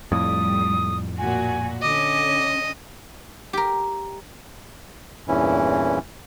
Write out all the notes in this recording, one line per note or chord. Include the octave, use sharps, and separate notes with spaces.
F2 A2 G3 D#6
A#2 F#4 G#5
D3 C#4 D#5 D6
G4 A#4
E2 G2 A#2 E3 C#4 E4